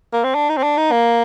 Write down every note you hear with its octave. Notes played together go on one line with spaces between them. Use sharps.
A#3
C4
D4
D#4
C4
D4
D#4
A#3